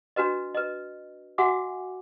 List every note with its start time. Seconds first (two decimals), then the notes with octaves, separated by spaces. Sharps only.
0.16 D4 F#4 B4 D#5
0.54 B4 D#5
1.38 F#4 E5 F#5 G#5 D6